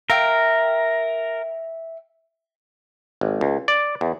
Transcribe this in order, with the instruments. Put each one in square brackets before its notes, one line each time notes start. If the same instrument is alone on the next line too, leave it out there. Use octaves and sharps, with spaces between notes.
[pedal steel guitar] A#4 [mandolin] E5 F5 G5
[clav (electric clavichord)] G#1
C#2
D5
E2